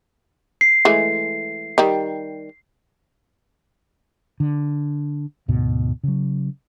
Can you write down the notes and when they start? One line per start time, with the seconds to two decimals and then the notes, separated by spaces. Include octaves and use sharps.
0.61 C7
0.85 E3 G#3 A3
1.78 D#3 G3
4.40 D3
5.48 D2 G#2 B2
6.03 C#3 F#3